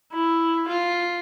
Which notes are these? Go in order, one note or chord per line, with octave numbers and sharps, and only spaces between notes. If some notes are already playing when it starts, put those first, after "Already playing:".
E4
F4